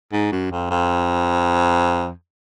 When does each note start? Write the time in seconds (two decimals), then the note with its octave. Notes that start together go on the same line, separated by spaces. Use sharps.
0.13 G#2
0.32 F#2
0.51 F2
0.71 F2